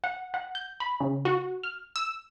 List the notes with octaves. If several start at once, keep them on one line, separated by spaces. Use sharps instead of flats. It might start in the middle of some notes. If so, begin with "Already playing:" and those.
F#5
F#5
G6
B5
C#3
F#4
F6
E6